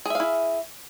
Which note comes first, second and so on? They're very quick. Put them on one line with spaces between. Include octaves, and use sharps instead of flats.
G#4 E5 F5 E4